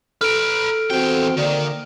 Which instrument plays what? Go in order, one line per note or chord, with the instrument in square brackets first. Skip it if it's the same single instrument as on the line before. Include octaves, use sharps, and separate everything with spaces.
[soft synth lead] A4 [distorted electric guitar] B4 A#5 [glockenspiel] F6 D7
[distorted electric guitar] E2 G5 [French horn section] C4 F#4
[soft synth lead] D3 [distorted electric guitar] D#3 [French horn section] A#3 D5